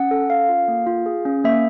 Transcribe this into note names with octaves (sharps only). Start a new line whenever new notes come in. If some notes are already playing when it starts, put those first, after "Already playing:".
Already playing: C#4 F#5
A4
C#4 F5
F4
A#3
F4
G#4
C#4
A#3 E5